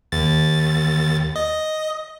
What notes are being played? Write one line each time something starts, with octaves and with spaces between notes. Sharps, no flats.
D#2 A6
D#5